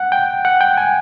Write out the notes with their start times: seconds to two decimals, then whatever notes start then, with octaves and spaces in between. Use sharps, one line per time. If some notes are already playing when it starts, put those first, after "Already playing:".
Already playing: F#5
0.12 G5
0.45 F#5
0.61 G5
0.78 G#5